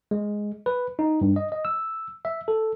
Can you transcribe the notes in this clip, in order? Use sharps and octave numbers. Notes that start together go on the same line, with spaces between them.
G#3
B4
D#4
G2
D#5
D#5
E6
E5
A4